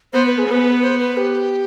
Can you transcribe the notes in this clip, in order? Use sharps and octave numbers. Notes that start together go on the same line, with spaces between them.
B3 C5
B4
G#4
B3 B4
C5
B4
G4